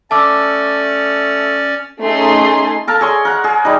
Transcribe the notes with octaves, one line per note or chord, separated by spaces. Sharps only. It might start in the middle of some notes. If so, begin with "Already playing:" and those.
A3 C#4 D5 A5 D6 E6
A3 C#4 D#4 G#4 C6
A4 A#4 F5 A5
G#4 C#5 C6
A#4 F#5
G#4
G3 D#4